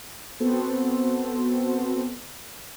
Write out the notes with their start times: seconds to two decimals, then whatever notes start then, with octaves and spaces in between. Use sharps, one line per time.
0.40 B3 C4 F#4 A4 C5